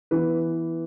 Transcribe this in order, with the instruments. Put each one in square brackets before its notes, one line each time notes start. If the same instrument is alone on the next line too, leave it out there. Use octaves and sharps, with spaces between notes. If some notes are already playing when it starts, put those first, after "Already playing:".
[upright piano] E3 B3 B4